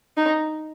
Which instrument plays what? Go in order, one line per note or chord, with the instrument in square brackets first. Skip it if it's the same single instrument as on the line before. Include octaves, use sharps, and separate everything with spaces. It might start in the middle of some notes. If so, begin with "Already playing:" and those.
[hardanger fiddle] D#4